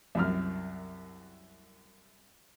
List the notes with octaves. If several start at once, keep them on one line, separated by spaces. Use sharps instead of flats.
C2 F#2 F6